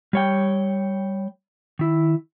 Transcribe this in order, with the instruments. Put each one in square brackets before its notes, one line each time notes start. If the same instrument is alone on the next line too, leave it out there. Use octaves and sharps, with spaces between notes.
[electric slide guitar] G3 C#5 G5
D#3 E4